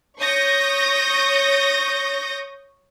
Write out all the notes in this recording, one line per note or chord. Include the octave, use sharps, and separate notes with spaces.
C#5 C#6 D#6 G6 A#6